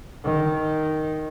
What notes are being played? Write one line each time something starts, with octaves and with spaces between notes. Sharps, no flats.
D#3